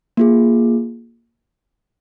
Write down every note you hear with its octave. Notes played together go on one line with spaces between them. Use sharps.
A#3 F4 G#4